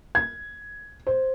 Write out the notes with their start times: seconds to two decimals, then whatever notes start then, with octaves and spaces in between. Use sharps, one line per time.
0.15 G#6
1.07 C5